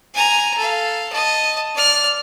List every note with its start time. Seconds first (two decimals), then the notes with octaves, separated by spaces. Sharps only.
0.15 G#5 A#5
0.58 A4 F5
1.13 D#5 A5
1.76 D5 F6